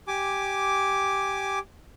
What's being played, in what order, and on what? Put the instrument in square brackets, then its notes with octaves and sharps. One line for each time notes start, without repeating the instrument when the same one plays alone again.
[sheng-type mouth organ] G4 G#5 D6